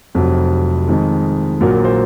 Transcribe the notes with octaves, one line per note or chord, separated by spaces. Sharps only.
F1 F2 C3 F#3
F2 D#3 G#3
A#1 A#2 F#3 A#4
A#4
C5